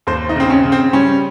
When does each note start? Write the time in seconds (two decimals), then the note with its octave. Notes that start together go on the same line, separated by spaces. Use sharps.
0.07 D#2 C5
0.29 D#4
0.36 C#3 C4
0.50 C#4
0.65 C#3
0.72 C4
0.93 G3 C#4